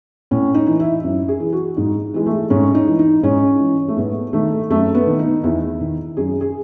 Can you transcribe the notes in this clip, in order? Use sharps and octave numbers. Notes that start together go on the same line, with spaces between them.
A2 C#4
D#4
E3
E4
F#2
G#4
E3
F#4
G#2 D#4
E3 G#3
A3
G#2 C#4
D#4
E3
D#4
G#2 C#4
E3
A3
G#2 B3
D#3 A3
F#2 A3
B3
D#3
D#4
E2 E4
D#3
F#2 G#4
G#4